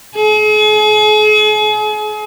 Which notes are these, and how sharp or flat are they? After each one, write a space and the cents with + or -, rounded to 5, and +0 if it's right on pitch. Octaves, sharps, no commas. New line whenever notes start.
G#4 +40